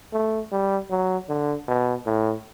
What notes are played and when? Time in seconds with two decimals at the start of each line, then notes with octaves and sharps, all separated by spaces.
0.13 A3
0.52 G3
0.90 F#3
1.29 D3
1.68 B2
2.06 A2